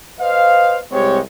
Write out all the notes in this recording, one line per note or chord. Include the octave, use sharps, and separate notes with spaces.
B4 C5 D#5 F5
C2 G#3 C4 G4 C#5